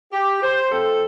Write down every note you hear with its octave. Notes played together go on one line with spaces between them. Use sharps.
G4
C5
F2 F3 A3 C4 A4